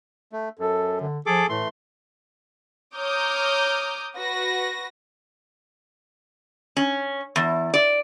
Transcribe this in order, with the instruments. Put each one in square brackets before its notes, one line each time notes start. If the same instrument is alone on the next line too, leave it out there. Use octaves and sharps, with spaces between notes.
[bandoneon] A3
[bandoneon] F#2 [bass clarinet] A4
[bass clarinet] D3
[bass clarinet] F3 [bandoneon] G#4 A4 D6
[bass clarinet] A2 [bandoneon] E3 A3 C6
[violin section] C#5 A#5 D6 D#6 F6 G6
F#4 B4 A#6
[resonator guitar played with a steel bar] C#4
E2
D5